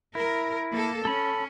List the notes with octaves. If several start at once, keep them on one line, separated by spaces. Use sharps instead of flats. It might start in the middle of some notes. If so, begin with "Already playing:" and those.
E4 A#4
A#3 A4
C#4 A4 B5